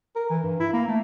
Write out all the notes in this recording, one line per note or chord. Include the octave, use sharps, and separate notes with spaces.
A#4
E3
G2
E4
A#3
A3